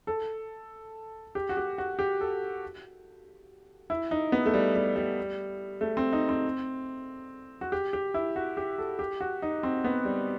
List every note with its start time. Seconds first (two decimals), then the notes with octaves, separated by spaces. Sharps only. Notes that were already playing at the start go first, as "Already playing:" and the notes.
0.07 A4
1.35 G4
1.49 F#4
1.57 G4
1.78 F#4
1.99 G4
2.21 A4
3.90 E4
4.11 D#4
4.32 B3
4.46 A3
4.54 G3
4.75 G3
4.96 G3
5.81 A3
5.97 C4
6.13 D#4
6.29 C4
7.61 F#4
7.72 G4
7.93 G4
8.14 E4
8.36 F#4
8.57 G4
8.78 A4
8.99 G4
9.21 F#4
9.42 D#4
9.63 C4
9.84 B3
10.05 G3